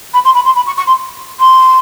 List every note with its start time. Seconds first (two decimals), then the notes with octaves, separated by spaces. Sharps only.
0.14 B5
0.25 C6
0.35 B5
0.45 C6
0.56 B5
0.66 C#6
0.77 C#6
0.87 C6
1.39 C6